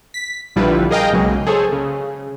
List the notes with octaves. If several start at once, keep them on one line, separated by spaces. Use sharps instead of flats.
B6
A#1 D3 G3 E4 F4 B4
G#4 A#4 D#5 F5 G5
B1 C#3 F#3 G#3 A#3
G#4 A4 C5 C#5
C#3